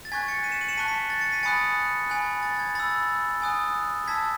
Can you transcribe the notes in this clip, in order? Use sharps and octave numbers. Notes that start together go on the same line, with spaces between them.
A6
G#5 C#6 F#6 G#6 B6
A6 C#7
B6 D#7
C#7 E7
D#7 F#7
C#7 E7
A5 C#6 F#6 B6 D#7
B6 D#7
A6
A6 C#7
B6 D#7
G#5 B5 D#6 F#6 A6 C#7
G#5 B5 F#6
A6
G#6
B5 E6 A6
G#5 D#6 F#6
A5 E6 G#6 B6